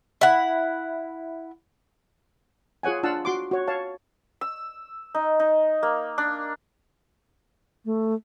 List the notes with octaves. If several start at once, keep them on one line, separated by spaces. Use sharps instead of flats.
E4 F#5
F4 G#4 C#5 F#5 G#5
D4 F4 F5 F#5 A5 E6
F#4 C6 D6
F#4 C#5
C#5 F5 A5
E6
D#4
D#4
A#3
D4
A3